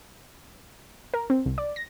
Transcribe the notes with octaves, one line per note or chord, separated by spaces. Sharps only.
A#4
C4
C2
D5
A#6